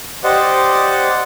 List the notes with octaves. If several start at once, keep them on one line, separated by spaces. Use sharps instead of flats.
G4 C5 D5 D#5 F#5